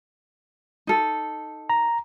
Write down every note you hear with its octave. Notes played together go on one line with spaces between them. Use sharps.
D#4 A4
A#5